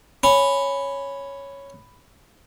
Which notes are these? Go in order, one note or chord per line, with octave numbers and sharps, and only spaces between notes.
C#4 B5